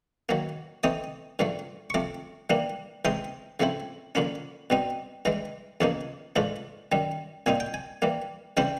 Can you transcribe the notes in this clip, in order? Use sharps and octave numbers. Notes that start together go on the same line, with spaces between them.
D#3 F#3 A#3
E3 A3 C4 D#4 D#6
G2 D3 F3 A3
C#6
C3 F3 A3 D6
E3 G3 A#3 D4
C3 E3 G#3 C4 D#4 C6
C#3 F3 A3 C4 E4
D3 F3 A#3 C#4 B5
B2 G3 C4 D#4
G2 E3 G#3 A#5
E2 C#3 F3 A#3 D#4 A5
G#2 E3 A3 D4 F4
F#2 D#3 G3
A#2 G3 C4 D#4 G#5
G5
G#5
E3 G3 A#3
C#3 E3 G3 C4 E4 G5